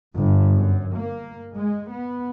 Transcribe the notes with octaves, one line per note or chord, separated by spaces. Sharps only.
G1
F#2
A#3
G#3
B3